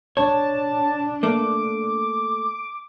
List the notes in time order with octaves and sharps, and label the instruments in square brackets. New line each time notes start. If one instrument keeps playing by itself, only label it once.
[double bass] D4 [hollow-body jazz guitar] C#5 [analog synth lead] A5
[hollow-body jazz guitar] A3 A#3 [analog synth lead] D6